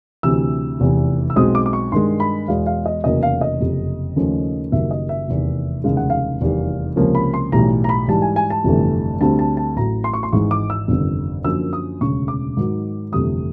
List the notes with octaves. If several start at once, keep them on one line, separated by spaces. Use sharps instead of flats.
D2 C3 E3 E6
F1 E2 C3 E3
E6
B1 B2 G#3 C4 D#6
D6
D6
C#6
G2 D#3 G#3 C6
B5
E2 B2 G#3 F5
F5
D#5
F1 E2 C#3 F#3 A#3 D#5
F5
D#5
F#1 F2 C3
D#2 C#3 F3 A3 C#4
F#1 F#2 D#3 G3 E5
D#5
E5
F1 E2 C3 D#3
F1 D#2 C#3 E3 G#3 F5
F#5
F5
F1 E2 C3 D#3 G3
C#2 C3 F3 A#3 C#4
B5
C6
B1 A2 E3 G3 A#5
A#5
B5
G#2 E3 G3 A5
G#5
G#5
A5
G1 F2 C3 E3 A3
D2 D3 G3 C4 A5
A5
A5
A1 A2 F#3 A#5
C6
C#6
C6
G#1 G#2 E3 G#3 C#6
D6
E6
G1 F2 C3 D#3
F#2 D3 F3 A#3 E6
D#6
E1 D2 C#3 C#6
D6
G#2 D#3 F#3
G1 F2 C3 E3 A3 D#6